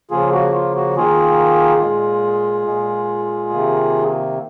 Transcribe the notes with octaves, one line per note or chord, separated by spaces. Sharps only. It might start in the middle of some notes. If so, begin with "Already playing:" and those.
C#3 F3 A#3 F4 G#4
F#4
F4
F#4
D#3 A#3 F4 G#4
A#2 G#3
A#2 G#3
C3 D#3 A#3